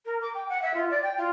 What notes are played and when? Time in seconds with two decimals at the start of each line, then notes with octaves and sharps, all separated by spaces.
0.05 A#4
0.21 D6
0.34 G5
0.48 F#5
0.62 E5
0.73 F4
0.90 D5
1.03 G5
1.17 F4